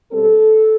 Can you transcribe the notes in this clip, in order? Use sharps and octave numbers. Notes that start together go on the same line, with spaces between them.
B2 G3 C4 A4